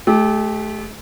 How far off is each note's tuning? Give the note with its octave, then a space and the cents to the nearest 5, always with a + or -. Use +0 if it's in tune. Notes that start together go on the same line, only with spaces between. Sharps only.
A3 -30 G4 +15